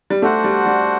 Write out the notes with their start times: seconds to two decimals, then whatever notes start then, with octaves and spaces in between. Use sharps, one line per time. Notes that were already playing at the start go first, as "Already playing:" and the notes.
0.10 G3
0.22 A3 D4 F#4 C5 F#5
0.44 G3
0.66 G3